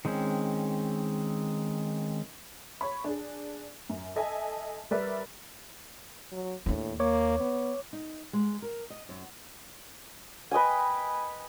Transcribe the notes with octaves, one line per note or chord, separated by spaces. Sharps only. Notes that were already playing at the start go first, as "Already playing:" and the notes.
D#3 G#3 C4 C#4
C#5 B5
D4 G#4
F#2
A4 D#5 E5 G#5 A5
G3 A#4 B4 D5 E5
F#3
D#2 A2 D4
A#3 C#5 D6
B3
D#4
G#3
A#4
D#5
F#2
B4 D#5 G5 G#5